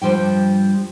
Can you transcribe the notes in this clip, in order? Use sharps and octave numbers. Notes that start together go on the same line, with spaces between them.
G2 E3 F3 G3 G5